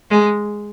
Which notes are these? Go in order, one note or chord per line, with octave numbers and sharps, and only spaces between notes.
G#3